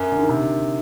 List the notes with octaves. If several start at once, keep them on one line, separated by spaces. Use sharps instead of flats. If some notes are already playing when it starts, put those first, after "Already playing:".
Already playing: F#2
D3
D#3
C3